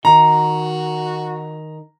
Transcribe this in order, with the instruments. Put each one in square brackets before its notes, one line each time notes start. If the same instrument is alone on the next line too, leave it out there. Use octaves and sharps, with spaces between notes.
[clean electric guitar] D#3 [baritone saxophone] F#4 [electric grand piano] A#5